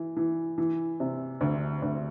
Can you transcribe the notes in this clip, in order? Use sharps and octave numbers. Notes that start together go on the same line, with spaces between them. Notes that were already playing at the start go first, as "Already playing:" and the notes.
Already playing: E3
E3
E3
C3
D2
D2